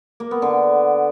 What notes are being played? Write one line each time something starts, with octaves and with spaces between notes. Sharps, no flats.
A#3
B3
D3